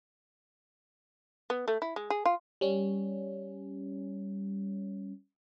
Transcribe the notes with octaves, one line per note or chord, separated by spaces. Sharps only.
B3
A3
E4
G#3
G#4
F4
G3 C#4